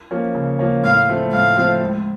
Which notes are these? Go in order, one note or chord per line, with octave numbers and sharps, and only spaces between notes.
F3 A#3 C#4
C#3
F3 A#3 C#4
A2 F5
F3 A3 C4
A2 F5
F3 A3 C4
C#2